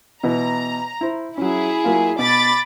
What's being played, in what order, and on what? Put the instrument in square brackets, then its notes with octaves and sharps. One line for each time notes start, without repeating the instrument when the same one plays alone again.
[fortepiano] B2 E3 [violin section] A#5
[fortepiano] E4 C5
[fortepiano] F#3 C#4 [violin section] E4 G#4
[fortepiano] F#3 A#3 F4
[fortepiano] B2 [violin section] B5 D6 A6